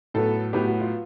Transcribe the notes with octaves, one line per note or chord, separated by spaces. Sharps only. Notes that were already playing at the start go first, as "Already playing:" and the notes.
A2 F#3 B3 A4
A2 F#3 B3 G4
F#4
F4